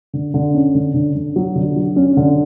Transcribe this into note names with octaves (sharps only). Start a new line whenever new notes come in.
D3
D3
C#4
D3
D3
D3
F#3
D3
F#3
C#4
D3